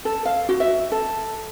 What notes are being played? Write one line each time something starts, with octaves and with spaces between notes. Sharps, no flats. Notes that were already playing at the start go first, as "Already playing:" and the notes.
A4
F5
F#4
E5
A4